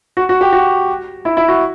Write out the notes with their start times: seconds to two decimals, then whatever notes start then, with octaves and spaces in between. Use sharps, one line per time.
0.17 F#4
0.29 F#4
0.41 G4
0.53 F#4
1.25 E4
1.37 E4
1.48 F#4